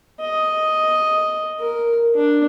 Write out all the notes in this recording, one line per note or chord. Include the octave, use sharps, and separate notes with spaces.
D#5
A#4
D4